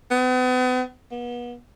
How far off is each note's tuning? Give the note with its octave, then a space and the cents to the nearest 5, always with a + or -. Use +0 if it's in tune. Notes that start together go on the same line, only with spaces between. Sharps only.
B3 +40
B3 -35